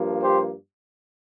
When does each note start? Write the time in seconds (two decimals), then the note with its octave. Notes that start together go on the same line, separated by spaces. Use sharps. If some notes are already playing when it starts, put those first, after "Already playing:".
Already playing: G2 F3 A#3
0.22 G4 C5